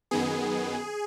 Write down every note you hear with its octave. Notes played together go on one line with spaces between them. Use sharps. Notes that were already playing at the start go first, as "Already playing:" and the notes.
F#2 D#3 B3 G#4